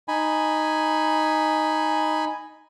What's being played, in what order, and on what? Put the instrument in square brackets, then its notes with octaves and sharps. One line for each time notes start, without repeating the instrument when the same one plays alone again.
[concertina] D#4 G#5 B5